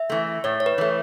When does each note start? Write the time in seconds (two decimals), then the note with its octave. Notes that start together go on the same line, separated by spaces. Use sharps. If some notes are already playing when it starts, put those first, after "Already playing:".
Already playing: E5
0.10 E3 A3
0.44 A2 C#5
0.60 C#5
0.66 B4
0.78 E3 A3